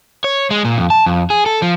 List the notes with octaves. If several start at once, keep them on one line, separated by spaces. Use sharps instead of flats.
C#5
G#3
A#2
F2
A5
F2
G#4
A4
F3